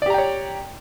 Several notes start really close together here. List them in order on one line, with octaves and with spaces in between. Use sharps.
D5 G4 A#5 G5 C#5